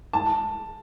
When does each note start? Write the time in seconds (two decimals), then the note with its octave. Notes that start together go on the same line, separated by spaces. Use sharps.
0.13 A5